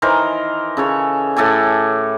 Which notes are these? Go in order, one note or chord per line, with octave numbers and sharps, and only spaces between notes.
D#3 E3 A#4 C5
C#3 A4 C#5
A2 A4 D5 G#5